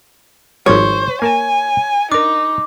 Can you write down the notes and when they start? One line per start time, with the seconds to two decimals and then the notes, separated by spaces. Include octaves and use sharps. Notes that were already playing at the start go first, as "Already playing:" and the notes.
0.66 G#1 F3 G3 C5 C#5
1.22 A#3 A#4 G#5 A5
2.12 D4 D#4 A#4 D6